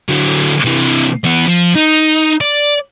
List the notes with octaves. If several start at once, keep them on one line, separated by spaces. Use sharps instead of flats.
D3 F#3
C3 E3
E3 B3
F3
D#4
D5